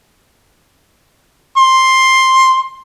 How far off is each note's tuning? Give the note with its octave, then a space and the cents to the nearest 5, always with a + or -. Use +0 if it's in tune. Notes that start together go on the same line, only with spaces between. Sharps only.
C6 +10